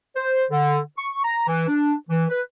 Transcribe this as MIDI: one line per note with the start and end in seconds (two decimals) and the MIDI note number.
0.16 0.44 72
0.50 0.78 50
0.97 1.21 85
1.24 1.45 82
1.47 1.66 52
1.67 1.93 62
2.08 2.24 52
2.28 2.41 71